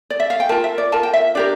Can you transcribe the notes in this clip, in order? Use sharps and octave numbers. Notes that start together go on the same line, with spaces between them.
D5
E5
F5
G5
F4 A#4 A5
E5
D5
F4 A#4 A5
G5
E5
D4 G4 A#4 D5